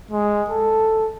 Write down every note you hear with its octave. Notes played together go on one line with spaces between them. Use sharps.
G#3
A4